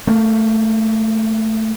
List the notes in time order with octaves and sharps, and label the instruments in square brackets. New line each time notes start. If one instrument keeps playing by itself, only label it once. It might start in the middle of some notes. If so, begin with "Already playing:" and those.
[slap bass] A3 A#3